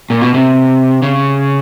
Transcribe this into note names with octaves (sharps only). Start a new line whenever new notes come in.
A#2
B2
C3
C#3